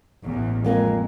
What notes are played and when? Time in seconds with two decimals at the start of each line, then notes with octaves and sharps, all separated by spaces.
0.25 A1 E2
0.65 F2 G#3 A#3 G#5